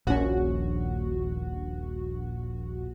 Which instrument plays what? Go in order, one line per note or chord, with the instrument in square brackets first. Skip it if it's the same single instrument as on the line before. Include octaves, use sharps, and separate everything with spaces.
[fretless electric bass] D#1 C#4 [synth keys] A#1 F#4